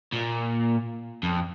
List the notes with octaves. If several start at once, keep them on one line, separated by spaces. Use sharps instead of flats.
A#2
F2